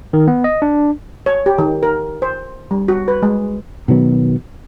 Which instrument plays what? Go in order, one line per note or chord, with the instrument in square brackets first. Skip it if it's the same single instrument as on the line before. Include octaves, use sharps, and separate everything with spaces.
[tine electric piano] D#3
B3
D#5
D4
[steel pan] C#5
G4
D#3
A#4
C5
G3
F#4
B4
G#3
[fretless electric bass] B2 D#3 F#3 B3